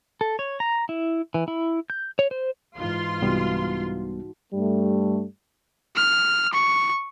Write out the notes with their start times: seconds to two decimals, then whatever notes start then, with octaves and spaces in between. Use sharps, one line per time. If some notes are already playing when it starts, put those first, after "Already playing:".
0.21 A4
0.39 C#5
0.60 A#5
0.89 E4
1.34 E3
1.48 E4
1.90 G6
2.19 C#5
2.31 C5
2.76 G#2 E3 F4 C6
3.22 C2 G3 B3 D#4 F#4
4.53 G2 G3 A3
5.96 F6
6.53 C#6